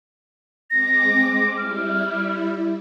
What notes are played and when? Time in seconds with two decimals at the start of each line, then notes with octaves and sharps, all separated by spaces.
0.70 G#3 C4 D6 A#6
1.57 G3 E4 F6